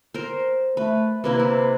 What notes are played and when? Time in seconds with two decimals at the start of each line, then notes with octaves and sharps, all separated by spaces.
0.14 A#4 C5
0.77 A3 B4
1.24 C3 A#3 E4 B4
1.39 E4